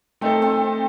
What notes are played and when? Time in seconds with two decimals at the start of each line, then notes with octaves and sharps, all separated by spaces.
0.21 A3 C4 D#4 A4
0.42 C4